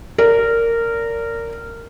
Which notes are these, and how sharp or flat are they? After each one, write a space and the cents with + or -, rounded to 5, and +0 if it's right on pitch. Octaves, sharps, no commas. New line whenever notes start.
A#4 -15 D5 -30